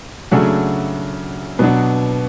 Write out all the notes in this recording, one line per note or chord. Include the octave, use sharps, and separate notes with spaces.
C#3 F#3 A3 D4 F#4
B2 F#3 B3 D4